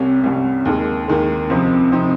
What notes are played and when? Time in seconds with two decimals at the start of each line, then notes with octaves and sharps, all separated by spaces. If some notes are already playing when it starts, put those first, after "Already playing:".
Already playing: C2 C3 G3 C#4
0.23 C2 C3 G3 C#4
0.65 D#2 D#3 G#3
1.08 D#2 D#3 G#3
1.50 C#2 C3 F3 C4 D#4
1.91 C3 F3 C4 D#4